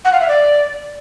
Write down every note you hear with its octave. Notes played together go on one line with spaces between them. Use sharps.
F#5
F5
E5
D5